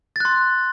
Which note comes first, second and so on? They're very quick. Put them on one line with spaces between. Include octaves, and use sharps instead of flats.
A6 F#6 C6